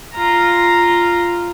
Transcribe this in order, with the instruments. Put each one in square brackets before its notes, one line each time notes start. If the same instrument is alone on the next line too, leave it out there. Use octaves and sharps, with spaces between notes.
[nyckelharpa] F4 A#5